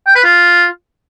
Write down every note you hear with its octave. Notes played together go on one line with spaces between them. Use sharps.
G5
B4
F4